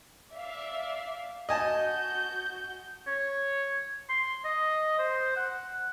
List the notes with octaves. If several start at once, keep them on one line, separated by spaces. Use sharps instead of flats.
D5 E5 F5
F#4 D#5 G#5 A5 G6
C#5
C6
D#5
C5
F#5